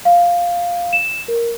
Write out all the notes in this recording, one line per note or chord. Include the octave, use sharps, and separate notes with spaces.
F5
E7
A#4